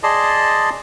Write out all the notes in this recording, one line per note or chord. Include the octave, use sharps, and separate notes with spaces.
G#4 D5 D#5 A5 C6